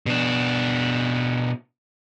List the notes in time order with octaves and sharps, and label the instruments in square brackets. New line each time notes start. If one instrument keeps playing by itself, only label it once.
[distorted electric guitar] B2 D4